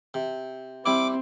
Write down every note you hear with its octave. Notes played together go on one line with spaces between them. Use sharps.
C3
G3 C4 E4 D6